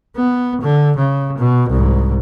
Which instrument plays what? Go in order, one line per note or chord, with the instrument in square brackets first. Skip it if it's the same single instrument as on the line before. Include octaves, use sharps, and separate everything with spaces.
[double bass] B3
D3
C#3
B2
C2 G#2